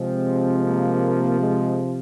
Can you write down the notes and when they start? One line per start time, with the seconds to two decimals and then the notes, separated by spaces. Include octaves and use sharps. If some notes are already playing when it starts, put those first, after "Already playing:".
Already playing: C3 F3 G#3 C4
0.64 A#3
1.39 G#3